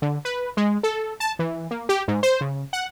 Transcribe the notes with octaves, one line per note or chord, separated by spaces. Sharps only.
D3
B4
G#3
A4
A5
E3
A#3
G4
G#2
C5
C#3
F#5